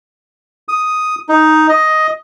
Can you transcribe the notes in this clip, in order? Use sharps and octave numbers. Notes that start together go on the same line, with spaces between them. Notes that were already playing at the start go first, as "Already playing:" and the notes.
D#6
D#4
D#5